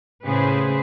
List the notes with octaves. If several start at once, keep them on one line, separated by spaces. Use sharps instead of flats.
A2 C#3 G#4 B4 C5